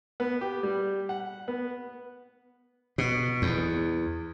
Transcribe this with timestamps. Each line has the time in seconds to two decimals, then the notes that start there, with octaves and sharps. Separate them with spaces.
0.20 B3
0.41 G4
0.63 G3
1.09 F#5
1.48 B3
2.98 B2
3.42 E2